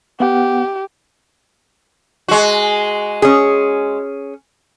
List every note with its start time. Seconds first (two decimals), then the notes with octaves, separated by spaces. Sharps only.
0.20 B3 G4 F#5
2.28 G#3 F#4
3.22 C#4 G#4